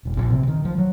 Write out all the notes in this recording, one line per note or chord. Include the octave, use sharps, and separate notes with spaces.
E1
A#1
C3
D#3
F3
F#3